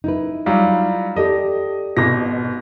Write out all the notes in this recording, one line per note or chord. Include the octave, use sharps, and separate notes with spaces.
D#4 E4 B4
F#3 G3 F4
G4 A4 D5 D#5
G#1 B2 A#6